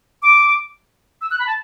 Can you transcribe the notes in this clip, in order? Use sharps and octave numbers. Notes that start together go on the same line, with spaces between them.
D6
E6
F#6
B5
A5